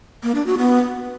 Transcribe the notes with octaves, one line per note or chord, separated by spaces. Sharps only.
A#3
D4
F#4
B3